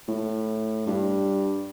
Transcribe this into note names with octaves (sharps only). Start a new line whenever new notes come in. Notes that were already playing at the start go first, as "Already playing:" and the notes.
A2
G2